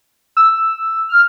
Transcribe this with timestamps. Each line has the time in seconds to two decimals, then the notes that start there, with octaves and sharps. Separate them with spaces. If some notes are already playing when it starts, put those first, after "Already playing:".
0.37 E6
1.09 F6